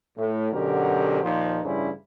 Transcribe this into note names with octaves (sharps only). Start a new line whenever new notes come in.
A2
F#2 B2 D3 G4 A#4 C5
D#2 A#2 F3 D#4 C5
A1 G2 C#3 G3 E4 C5